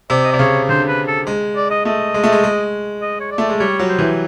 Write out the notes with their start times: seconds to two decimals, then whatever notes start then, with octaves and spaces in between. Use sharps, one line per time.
0.10 C3 D5
0.24 D#5
0.32 C3 D5
0.39 C#3 C#5
0.69 D3 C5
0.88 B4
1.07 A4
1.27 G#3
1.56 D5
1.70 D#5
1.85 A3 D#5
2.14 G#3
2.23 A3
2.32 G#3
2.43 G#3
3.02 D#5
3.20 C#5
3.31 D5
3.38 A3
3.50 G#3
3.60 G3 C#5
3.79 F#3
3.89 C5
3.99 E3